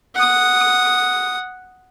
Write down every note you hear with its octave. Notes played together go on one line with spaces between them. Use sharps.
F#5 D#6